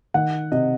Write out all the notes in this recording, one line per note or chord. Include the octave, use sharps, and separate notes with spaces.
D#3 F#5
C3 D#5